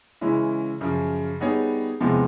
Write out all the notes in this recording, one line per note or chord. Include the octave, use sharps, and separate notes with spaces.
C#3 E3 G#3 C#4 E4
F#2 C#3 F3
G3 B3 D#4 G#4 C#5
E2 C3 F3 G#3 B3